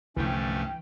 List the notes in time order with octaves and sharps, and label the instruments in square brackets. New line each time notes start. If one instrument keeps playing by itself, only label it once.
[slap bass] C2 D3 F3 [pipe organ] G2 A3 C#4 [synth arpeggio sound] E3 G5